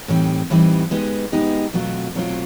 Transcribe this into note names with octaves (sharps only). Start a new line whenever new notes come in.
A2 E3 G3 C4 D#4
A2 E3 G3 C4 D#4
G#3 B3 D#4 G4
G#3 B3 D#4 G4
B2 F#3 A3 C4 F4
B2 F#3 A3 C4 F4